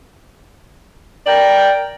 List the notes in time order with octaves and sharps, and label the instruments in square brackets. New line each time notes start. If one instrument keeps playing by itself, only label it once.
[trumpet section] A#4 G5 [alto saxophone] D5